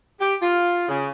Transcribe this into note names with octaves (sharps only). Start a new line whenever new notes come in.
G4
F4
C#3